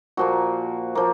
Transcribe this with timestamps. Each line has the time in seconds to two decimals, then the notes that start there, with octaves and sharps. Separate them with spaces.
0.17 A#2 F3 A#3 F#4
0.95 F3 A#3